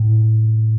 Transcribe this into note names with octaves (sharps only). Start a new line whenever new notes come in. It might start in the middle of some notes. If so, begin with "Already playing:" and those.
Already playing: A2